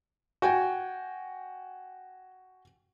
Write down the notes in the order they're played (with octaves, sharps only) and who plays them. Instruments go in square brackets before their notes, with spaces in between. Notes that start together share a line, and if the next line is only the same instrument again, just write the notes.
[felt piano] F#4 G5 G#5